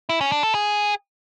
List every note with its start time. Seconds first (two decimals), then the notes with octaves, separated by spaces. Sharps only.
0.09 E4
0.21 C#4
0.32 D4
0.43 A4
0.55 G#4